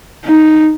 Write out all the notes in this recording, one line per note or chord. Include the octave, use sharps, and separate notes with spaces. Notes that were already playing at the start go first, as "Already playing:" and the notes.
D#4